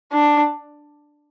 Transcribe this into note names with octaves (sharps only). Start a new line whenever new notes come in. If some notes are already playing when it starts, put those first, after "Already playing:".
D4